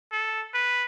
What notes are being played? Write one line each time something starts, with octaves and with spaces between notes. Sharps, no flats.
A4
B4